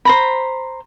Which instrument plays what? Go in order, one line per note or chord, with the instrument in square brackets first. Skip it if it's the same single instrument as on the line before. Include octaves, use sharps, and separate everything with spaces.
[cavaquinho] C5 A#5 B5